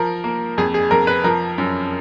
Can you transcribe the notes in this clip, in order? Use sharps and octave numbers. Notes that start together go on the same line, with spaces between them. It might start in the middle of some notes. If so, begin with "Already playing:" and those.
Already playing: F3 A#4
A#3
F2 G#4
G#4
F2 A#4
B4
F3 A#4
F#2